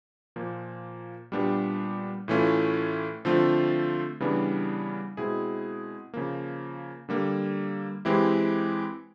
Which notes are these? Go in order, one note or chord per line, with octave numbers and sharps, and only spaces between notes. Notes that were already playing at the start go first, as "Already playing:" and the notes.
A#2 F3 A#3
A#2 G3 B3 D4 G4
A2 E3 A3 C#4 F4
D3 F3 A3 C4 F4
C#3 E3 G3 B3 D4
B2 G#3 C4 E4 G#4
C#3 F3 A#3
D3 G3 A#3
E3 G#3 C4 E4 G4